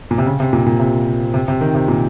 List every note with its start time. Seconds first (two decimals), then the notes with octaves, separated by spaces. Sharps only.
0.11 A#2
0.18 C3
0.26 C#3
0.40 C3
0.53 A#2
0.66 A#2
0.80 C3
1.34 C3
1.48 C3
1.61 D#3
1.75 C3
1.88 A#2